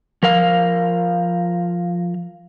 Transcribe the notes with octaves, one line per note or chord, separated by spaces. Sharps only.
F3 A#4 F5